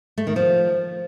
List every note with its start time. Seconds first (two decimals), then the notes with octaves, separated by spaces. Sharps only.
0.18 A3
0.27 D#3
0.36 F3